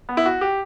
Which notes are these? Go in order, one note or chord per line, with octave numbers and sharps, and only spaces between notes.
B3
E4
F#4
G4